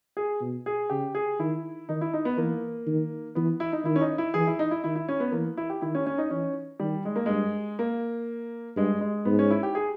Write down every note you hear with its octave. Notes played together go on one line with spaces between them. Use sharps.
G#4
B2
G#4
C#3 G4
G#4
D#3 E4
D#3 D#4
E4
D#4
B3
E3 A#3
D#3
E3 B3
E4
D#4
D#3 E4
C#4
D#4
E4
E3 G#4
E4
D#4
E4
D#3 E4
E4
C#4
B3
E3 A#3
E4
G4
D#3 E4
C#4
C#4
D#4
E3 C#4
D#3 G3
G#3
A#3
G2 G#3
A#3
G2 G#3
G#3
G#2 B3
C#4
E4
G4
G#4